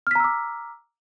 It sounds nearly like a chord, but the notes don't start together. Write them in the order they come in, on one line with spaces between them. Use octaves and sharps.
F6 B6 A#5 E6 D6